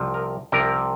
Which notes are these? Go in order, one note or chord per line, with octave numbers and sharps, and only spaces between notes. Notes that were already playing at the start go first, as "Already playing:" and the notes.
Already playing: C2 C3 F3
A#4
C2 C3 F3 A#4